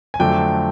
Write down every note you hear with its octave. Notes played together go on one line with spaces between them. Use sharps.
G#5
F2 D3 F#3 A3 D4 G5